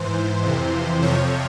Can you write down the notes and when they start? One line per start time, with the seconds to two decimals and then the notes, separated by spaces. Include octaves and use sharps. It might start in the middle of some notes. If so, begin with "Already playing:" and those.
Already playing: G#2 E3 C5
0.43 F2 C3 E3
1.02 F2 C3 F3 C#5